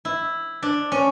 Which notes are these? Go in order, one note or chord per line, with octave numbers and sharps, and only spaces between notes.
E4
D4
C#4